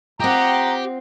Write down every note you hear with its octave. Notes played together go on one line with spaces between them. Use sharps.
C4 F4 G4 D#5 F#5 A#5